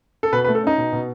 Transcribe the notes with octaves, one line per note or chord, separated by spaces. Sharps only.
A4
B2 B4
B4
A3
A4
C#4 D#4
B2
B2